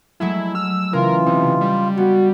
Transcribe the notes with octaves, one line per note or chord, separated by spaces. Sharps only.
F#3 G#3 A3 E4
E6 F6
C#3 E3 F4 A#4
C3 D#4
G3
B3 F#4